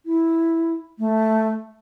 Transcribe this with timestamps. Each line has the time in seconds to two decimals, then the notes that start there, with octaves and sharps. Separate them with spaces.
0.06 E4
0.99 A3